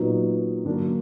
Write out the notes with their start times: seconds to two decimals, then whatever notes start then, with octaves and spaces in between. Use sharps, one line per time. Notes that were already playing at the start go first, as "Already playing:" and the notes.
Already playing: A#2 F#3 B3 D#4
0.65 D3 F#3 A#3 D4